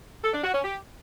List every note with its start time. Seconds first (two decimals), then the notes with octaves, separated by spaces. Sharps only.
0.24 A4
0.34 D4
0.44 F#4
0.54 C#4
0.64 G4